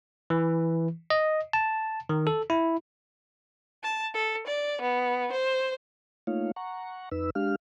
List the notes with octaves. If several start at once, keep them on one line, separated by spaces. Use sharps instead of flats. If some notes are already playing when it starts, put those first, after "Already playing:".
E3
D#5
A5
D#3
A4
E4
A5
A4
D5
B3
C5
A3 A#3 D#4 F4 C#5 F5
F#5 A#5 C#6
F2 D#4 B4 E6
G#3 D4 G4 F5 F6